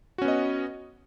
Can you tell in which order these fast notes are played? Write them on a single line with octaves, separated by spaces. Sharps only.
F#4 C#4 B3 D#5